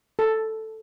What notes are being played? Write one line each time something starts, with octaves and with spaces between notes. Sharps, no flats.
A4